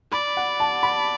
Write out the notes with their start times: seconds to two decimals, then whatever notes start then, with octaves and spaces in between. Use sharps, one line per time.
0.12 D5 B5
0.37 F#5
0.60 A5
0.83 B5